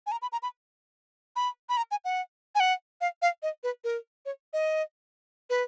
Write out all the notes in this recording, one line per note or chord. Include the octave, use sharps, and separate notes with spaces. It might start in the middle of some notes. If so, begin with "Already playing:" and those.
G#5
A#5
B5
A#5
B5
B5
B5
A#5
G#5
F#5
G#5
F#5
F5
F5
D#5
B4
A#4
C#5
D#5
B4